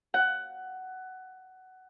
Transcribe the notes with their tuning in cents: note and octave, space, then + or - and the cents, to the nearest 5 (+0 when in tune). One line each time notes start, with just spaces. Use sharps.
F#5 +15